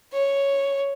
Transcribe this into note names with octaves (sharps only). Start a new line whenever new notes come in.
C#5